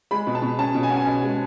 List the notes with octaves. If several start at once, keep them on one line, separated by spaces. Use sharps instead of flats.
G#3 B5
B2
A5
B2
C#4 A5
B2
G#5
C#4 F#5
G#5
B2
G#3